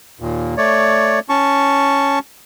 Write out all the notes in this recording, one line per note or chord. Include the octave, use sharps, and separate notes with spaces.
D#2 A#2
A3 C#5 D5
C#4 A5 C#6